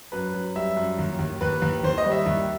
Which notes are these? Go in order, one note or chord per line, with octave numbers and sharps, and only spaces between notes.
F#2 B4
F#2
G3 E5
F#2
D#2
D#2
D#2 B4
D#2
D#2 C5
D#5
G3
E5
D#2